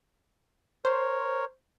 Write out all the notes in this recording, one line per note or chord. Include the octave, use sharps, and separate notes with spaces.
A#4 C5 C#5